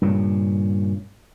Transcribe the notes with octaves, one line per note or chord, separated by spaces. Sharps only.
G2 A#2 C#3